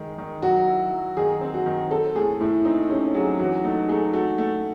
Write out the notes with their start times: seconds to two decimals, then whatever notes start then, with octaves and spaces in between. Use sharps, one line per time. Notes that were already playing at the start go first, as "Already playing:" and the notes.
Already playing: D#3 G#3
0.18 D#3
0.42 F#3 F#4
0.68 E4
0.91 F#3
1.17 D#3 G#4
1.41 C4
1.54 F#4
1.66 D#3
1.90 C4 A4
2.15 A2 G#4
2.40 A2 E4
2.65 C4 D#4
2.90 C3 C#4
3.14 F#3 G#4
3.39 E3 F#4
3.64 A3 D#4
3.88 A3 G#4
4.13 A3 F#4
4.38 A3